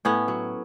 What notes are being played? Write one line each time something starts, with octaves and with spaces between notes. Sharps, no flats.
A2 B3 C#4
F#3